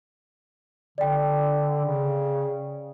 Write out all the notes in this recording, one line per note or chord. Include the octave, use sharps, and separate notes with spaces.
D3 D5 G5
C#3